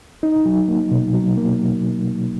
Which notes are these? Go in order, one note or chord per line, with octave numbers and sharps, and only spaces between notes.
D#4
F#3
A#3
B2
F#3
A#3